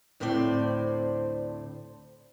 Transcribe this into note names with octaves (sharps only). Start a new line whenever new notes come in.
D2 A2 C4 C5 D5